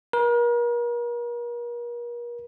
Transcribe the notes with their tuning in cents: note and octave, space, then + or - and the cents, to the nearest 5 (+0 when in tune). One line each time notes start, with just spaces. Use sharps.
A#4 +40